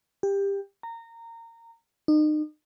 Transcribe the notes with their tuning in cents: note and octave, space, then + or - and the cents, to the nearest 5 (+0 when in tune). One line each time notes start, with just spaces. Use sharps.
G4 +20
A#5 -20
D#4 -35